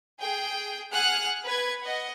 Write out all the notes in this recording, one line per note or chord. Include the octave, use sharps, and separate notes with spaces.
G#4 G5
G#4 F#5 G#5 F6 F#6
B4 G#6
D#5 F#5